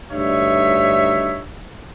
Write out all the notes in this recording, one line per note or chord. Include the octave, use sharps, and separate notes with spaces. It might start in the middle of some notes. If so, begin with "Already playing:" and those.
D2 G2 D#4 C#5 E5